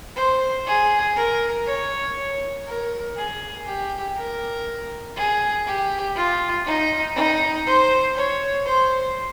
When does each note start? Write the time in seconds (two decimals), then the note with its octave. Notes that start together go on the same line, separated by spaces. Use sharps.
0.16 C5
0.66 G#4
1.16 A#4
1.66 C#5
2.67 A#4
3.16 G#4
3.66 G4
4.16 A#4
5.16 G#4
5.66 G4
6.16 F4
6.66 D#4
7.16 D#4
7.66 C5
8.15 C#5
8.65 C5